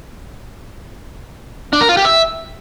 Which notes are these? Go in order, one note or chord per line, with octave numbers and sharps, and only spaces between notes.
D4
A#4
F4
G4
E5